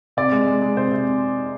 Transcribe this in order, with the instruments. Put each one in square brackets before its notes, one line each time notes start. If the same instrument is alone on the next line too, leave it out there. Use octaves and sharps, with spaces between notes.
[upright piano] C3 D5
G#3
G#3
G#3
C3 C5
C3